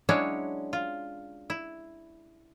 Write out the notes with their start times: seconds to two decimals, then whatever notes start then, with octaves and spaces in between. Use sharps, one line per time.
0.09 F#3 G#3 C#4 D4 E4 C#5
0.73 F4
1.50 E4